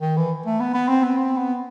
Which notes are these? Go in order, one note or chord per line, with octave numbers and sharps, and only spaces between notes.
D#3
E3
A3
B3
B3
C4
B3
C4
B3